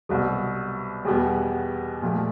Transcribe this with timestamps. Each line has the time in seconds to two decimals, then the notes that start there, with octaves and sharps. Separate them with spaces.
0.09 C2 B2 F#3 B3
1.05 E2 B2 G3 B3
2.02 A#2 F3 A3